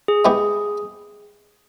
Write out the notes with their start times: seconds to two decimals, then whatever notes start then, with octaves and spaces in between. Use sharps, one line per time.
0.08 G#4
0.25 G#3 B3 E4 G4